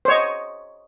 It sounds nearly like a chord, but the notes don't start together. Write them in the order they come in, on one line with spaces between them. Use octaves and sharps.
C5 C#5 D#5